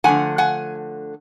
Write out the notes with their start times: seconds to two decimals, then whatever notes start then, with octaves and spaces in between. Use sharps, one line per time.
0.04 D3 F3 A3 F#5 G#5
0.38 F#5 G#5